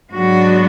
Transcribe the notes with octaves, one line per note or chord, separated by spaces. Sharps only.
G#2 F#3 B3 D4 F#4